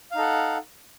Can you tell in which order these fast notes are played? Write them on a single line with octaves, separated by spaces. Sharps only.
F5 D#4 A4 F#5